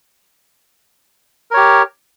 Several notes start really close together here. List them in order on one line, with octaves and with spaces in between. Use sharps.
A#4 C#5 G4